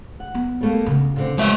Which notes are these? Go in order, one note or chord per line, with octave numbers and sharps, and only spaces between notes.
F#5
B3
G3 A3 A#3
D2 C#3
A#2 D3 C4
F#3 G#3 B4 E5